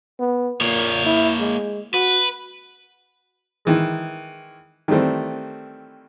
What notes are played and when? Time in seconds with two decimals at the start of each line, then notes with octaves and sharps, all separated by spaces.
0.20 B3
0.61 A#2 A#3 C#5
1.06 E4
1.40 G#3
1.94 F#4 B4
3.65 D#3 E3 G#3
4.88 D#3 E3 G3 A3 C4